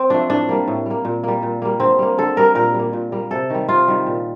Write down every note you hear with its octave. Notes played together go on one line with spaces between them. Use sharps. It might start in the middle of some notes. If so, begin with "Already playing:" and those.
Already playing: C4
F3 A3 D4
A2 D4
G3 A#3
A2
G3 A#3
A#2
G3 A#3
A#2
G3 A#3
D3 C4
G3 A#3
D3 A4
G3 A#3 A#4
A#2 A#4
G3 A#3
A#2
G3 A#3
C3 A4
D#3 G3
C3 F4
D#3 G3
A#2